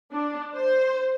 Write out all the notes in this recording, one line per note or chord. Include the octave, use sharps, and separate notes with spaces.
D4
C5